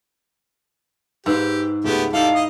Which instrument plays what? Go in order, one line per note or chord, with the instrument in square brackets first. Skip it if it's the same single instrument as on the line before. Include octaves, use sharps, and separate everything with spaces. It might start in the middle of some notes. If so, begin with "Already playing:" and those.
[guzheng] G#2 [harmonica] G4 [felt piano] B4 E6
[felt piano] C#2 [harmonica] A3 B3 G4
[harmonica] G3 A4 D5 [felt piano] D#4 E4 [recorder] F5
[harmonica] D#5